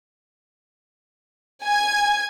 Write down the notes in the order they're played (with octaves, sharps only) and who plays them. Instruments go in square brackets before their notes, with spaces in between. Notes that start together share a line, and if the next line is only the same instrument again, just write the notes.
[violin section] G#5 G#6